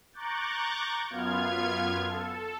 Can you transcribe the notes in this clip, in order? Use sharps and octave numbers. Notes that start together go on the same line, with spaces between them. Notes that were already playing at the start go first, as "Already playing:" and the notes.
A#5 C#6 D6 F#6 G6 A6
F#2 B3 F4 F6 G#6
A4